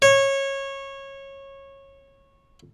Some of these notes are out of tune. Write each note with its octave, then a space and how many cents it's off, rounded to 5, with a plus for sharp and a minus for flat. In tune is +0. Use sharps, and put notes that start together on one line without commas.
C#5 -20